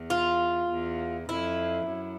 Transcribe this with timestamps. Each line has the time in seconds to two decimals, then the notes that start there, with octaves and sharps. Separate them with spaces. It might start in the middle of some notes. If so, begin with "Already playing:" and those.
Already playing: E2
0.10 F4
0.70 E2
1.29 F2 E4
1.87 F#2